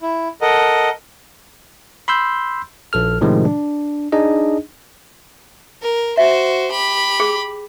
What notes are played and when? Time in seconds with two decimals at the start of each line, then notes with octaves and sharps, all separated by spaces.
0.02 E4
0.41 A4 A#4 D#5 F#5
2.08 B5 C6 E6 G6
2.93 A#1 A4 F6
3.21 A2 C3 D#3 F3 G#3
3.45 D4
4.12 D4 D#4 G#4 D#5
5.82 A#4
6.17 F#4 C5 E5
6.71 G4 B5
7.20 G#4